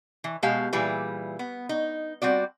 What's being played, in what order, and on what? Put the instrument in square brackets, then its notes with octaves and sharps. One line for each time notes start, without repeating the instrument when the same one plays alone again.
[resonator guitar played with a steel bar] E3
B2 G#3 G4 F5 A5
A#2 E3 G3 E4 G#4 B4
B3
D#4
G3 C4 F#4 D5